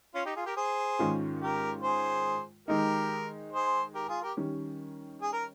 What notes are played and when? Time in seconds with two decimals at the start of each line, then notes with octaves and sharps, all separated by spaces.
0.14 C#4 F4
0.25 D#4 G4
0.36 F4 G#4
0.46 G4 A#4
0.57 G#4 C5
0.99 G#2 D#3 G#3 C#4 F4
1.41 G4 A#4
1.83 G#4 C5
2.68 D#3 G#3 D#4 G4 A#4
3.52 G#4 C5
3.94 G4 A#4
4.09 F4 G#4
4.22 G4 A#4
4.37 D#3 G3 C#4
5.22 G#4
5.33 A#4